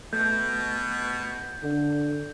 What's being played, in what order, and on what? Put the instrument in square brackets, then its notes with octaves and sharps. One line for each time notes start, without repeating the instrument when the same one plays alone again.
[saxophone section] B2 [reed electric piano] A3 [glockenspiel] G6
[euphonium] D3 [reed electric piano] D4